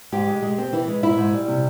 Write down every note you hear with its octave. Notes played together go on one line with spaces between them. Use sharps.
G#2 G4
G#3
G#3
C4
E3 E4
G#3
G#2 E4
G#2
G3
C3